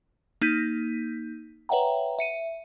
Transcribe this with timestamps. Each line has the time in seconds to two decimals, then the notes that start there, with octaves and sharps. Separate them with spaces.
0.41 A#3 D#4 G6 B6 D#7
1.69 B4 C#5 E5 F#5 G5 A#5
2.19 E5 C#7 D#7